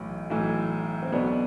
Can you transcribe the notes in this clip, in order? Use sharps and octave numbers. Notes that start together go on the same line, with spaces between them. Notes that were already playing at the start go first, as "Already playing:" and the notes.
Already playing: B1 A2 E3
B1 A2 E3
C4
B1 B2 B3 D4